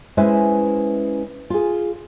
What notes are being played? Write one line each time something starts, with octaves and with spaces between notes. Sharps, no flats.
G#3 C#4 E4 B4 C5 E5
F4 G#4